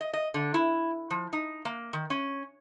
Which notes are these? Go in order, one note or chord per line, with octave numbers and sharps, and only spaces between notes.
D#5
D#5
D3
E4
F3
D#4
A#3
D#3
C#4